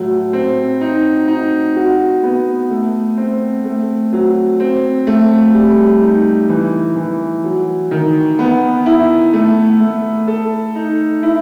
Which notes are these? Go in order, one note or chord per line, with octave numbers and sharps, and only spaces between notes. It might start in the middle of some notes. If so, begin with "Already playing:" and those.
Already playing: A2 F#3 A3
C4
D#4
D#4
F#4
B3
A3
C4
A3
F#3
C4
A3
G3
D#4
E3
E3
F#3
D#3
B3
E4
A3
A3
A4
D#4
E4